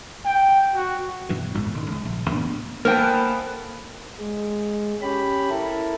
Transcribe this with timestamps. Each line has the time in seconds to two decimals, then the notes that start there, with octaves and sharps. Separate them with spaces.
0.25 G5
0.75 F#4
1.29 G2 B2 E3
1.54 D#1 G#1 E2 G#2
1.74 D#1 D#3
1.91 C#2
2.05 A#1
2.31 D#2 A2 B3 D4
2.85 E3 A#3 B3 A4 A#4 C5 G5
4.20 G#3
5.02 C#4 G4 B5
5.50 E4 A4 A#4